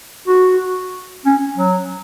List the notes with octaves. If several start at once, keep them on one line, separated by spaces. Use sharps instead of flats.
F#4
C#4
F#3